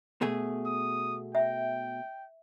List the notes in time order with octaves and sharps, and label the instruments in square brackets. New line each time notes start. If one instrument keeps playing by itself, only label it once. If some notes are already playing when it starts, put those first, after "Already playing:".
[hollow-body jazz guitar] B2 A3 G#4
[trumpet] D#6
[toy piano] E5 [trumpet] G5